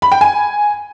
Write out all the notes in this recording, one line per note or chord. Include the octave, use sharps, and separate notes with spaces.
B5
G5
G#5